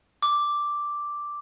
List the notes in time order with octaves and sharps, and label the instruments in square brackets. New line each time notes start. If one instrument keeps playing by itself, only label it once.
[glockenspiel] D6